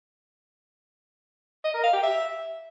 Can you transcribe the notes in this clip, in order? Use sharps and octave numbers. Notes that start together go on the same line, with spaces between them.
D#5
A#4
F5
G4
E5